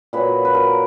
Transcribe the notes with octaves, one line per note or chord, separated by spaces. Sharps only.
A#2 F#3 B4
B4
A#4